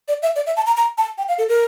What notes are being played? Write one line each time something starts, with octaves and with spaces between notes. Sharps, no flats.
D5
E5
D5
E5
A5
A#5
A#5
A5
G5
F5
A4
A#4